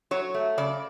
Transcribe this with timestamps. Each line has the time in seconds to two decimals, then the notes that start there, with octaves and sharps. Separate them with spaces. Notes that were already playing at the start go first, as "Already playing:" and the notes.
0.11 F#3 C#5
0.34 A3
0.58 C#3 D5